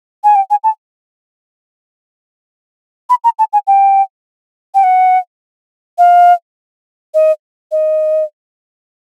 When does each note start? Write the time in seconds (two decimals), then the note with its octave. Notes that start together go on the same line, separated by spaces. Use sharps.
0.24 G#5
0.35 G5
0.50 G#5
0.64 A5
3.09 B5
3.24 A#5
3.39 A5
3.53 G#5
3.67 G5
4.75 G5
4.83 F#5
5.98 F5
7.14 D#5
7.72 D#5